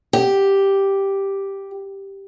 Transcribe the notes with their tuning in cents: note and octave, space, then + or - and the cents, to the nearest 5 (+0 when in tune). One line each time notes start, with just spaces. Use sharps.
G4 +0